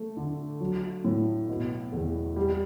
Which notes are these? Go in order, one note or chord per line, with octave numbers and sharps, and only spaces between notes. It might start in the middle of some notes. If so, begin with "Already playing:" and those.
Already playing: A3
D3
F#3
A2
B2
E2
G3